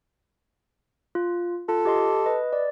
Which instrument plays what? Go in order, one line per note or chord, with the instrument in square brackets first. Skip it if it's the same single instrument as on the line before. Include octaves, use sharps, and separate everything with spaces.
[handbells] F4
[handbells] F4 [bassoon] A4
[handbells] G4 D#5 C6
B4 D#5
D5